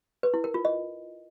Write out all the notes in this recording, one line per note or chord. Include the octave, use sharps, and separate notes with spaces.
B4
E4
A#4
F4
D#5